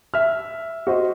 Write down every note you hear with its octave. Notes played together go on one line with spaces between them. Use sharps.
E5 F6
F#4 C5 D#5